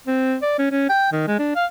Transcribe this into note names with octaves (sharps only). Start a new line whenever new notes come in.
C4
D5
C#4
C#4
G5
D#3
G#3
D4
F5